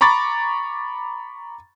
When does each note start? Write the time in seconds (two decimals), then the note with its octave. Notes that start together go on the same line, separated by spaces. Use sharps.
0.01 A#5 B5 C#6 D6 A6